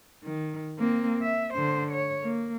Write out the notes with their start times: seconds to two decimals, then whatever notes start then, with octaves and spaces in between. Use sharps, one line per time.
0.24 D#3
0.79 A#3 C4
1.22 E5
1.53 D3 C5
1.91 C#5
2.23 A#3